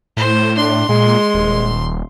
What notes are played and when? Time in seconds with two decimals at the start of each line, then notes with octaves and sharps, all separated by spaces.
0.17 A2 C5
0.57 D4 C6
0.89 A#2 G#3
1.34 D#1